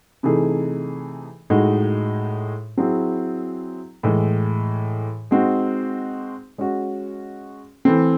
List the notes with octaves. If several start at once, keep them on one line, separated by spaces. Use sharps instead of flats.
C3 E3 A3 D#4 G#4
A2 G#3 D#4 F#4
F#3 C4 E4 G#4
A2 E3 G#3
G#3 C4 D#4 F#4
G#3 C#4 F#4
E3 A3 C4